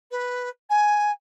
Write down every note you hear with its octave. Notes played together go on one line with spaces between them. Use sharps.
B4
G#5